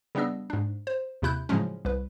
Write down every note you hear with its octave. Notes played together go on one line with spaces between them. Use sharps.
C#3 G3 B3 D4 D#5 E6
G#2 D4
C5
D#2 C3 E4 F#6 G6
A2 C#3 F3 F#3 G#3 C#4
C2 B4